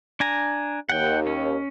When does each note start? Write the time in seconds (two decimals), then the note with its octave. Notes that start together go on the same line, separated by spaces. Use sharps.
0.20 D4 G#5 A#5
0.89 D#2 F#5 G5
1.27 C#4